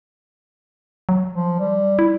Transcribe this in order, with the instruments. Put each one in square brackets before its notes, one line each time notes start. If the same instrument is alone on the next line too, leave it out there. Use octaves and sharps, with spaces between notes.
[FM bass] F#3
[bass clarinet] F3
G3
[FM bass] E4